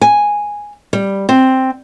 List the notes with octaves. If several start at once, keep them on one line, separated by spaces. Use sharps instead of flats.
G#5
G3
C4